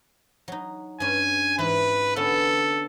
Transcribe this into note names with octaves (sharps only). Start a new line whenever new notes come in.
F#3 D#4
G2 C#4 G#5
G#2 E3 B4
D3 B3 C#4 A4